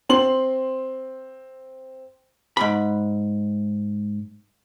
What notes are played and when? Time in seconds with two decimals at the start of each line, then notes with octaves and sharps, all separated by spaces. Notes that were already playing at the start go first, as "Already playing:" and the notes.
0.09 C4 C6 F#7
2.57 G#2 B5